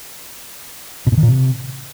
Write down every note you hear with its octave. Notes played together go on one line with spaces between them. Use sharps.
B2
A#2
D#3
A#2
C3